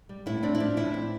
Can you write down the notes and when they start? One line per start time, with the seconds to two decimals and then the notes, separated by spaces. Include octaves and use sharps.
0.09 G3
0.26 A2 E4
0.43 C4 D4
0.55 E4
0.60 F3 D4
0.77 A2 E4
0.94 C4